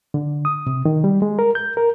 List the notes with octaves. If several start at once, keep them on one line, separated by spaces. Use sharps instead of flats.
D3
D#6
C3
D#3
G3
G#3
A#4
G6
A#4